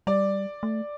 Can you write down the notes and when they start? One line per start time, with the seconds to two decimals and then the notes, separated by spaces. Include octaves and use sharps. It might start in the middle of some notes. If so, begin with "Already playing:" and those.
0.07 G3 D5
0.63 A3